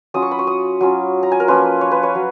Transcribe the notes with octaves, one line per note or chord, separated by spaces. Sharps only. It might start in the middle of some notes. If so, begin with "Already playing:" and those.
F#3 C#4 F4 D#6
C#6
B5
C#6
D#6
F#3 C#4 F4
A#5
G#5
A#4
F3 A#3 C#4 F4 B4
C#5
B4
C#5
F#3